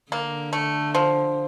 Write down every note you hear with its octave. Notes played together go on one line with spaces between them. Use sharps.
D3 A#3
A3
F3